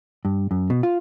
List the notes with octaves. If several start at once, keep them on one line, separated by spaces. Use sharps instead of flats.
G2
F#2
B2
F4